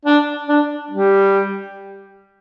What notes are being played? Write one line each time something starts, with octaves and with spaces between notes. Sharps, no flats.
D4
D4
G3